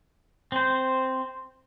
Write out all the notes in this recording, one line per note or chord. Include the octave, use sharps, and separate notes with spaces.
C4 C5